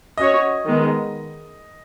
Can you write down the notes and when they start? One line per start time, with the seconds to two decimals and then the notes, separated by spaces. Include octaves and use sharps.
0.18 C#4 F#4 C#5 D#5
0.65 D#3 G#3 B3